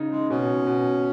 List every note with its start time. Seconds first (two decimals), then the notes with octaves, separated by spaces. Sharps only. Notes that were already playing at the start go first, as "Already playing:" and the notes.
Already playing: C#3 D#4
0.11 G#3
0.30 B2 C#4
0.67 B2